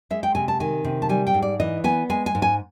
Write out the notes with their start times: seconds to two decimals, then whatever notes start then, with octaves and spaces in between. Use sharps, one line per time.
0.10 G#3 E5
0.23 G5
0.35 C3 G#5
0.48 A5
0.60 D#3 G#5
0.84 C3
1.02 A5
1.09 G3 G#5
1.27 G5
1.34 G#2
1.42 D5
1.60 E3 D#5
1.84 B3 G#5
2.10 G#3 G#5
2.26 G#5
2.35 G#2
2.42 G#5